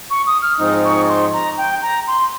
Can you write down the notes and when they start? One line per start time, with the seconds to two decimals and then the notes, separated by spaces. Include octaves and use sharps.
0.10 C#6
0.27 D#6
0.42 F6
0.59 G#2 F3 C4 D#4 D#6
0.85 C#6
1.09 C6
1.33 A#5
1.58 G5
1.82 A#5
2.07 C6